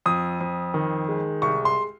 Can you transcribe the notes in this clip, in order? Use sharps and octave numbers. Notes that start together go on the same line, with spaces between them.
F2 D#6
F2
D#3
G#3
C2 C#6
C6